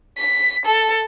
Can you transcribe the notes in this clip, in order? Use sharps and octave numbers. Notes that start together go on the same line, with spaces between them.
B6
A4